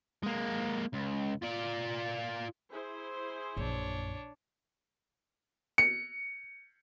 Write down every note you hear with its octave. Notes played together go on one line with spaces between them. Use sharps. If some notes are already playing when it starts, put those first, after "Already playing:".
G#3 A#3
C#2
F4 D5
E4 G#4 C5
A#1 F#2 D4 C#5
C#7